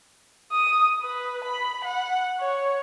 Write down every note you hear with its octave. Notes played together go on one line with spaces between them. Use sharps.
D#6
B4
B5
F#5
C#5